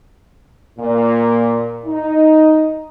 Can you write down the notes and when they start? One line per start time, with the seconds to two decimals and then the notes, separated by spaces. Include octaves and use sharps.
0.79 A#2
1.86 D#4